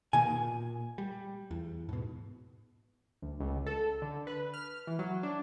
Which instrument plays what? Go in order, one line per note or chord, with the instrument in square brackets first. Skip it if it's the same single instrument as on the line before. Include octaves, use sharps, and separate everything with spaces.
[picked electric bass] B2 D#3 A#3 [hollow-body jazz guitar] G#5
[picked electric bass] A#2
G3
E2
G#2 B2
[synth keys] D2
C#2
A4
D3
B4
F6
E3
F#3
D4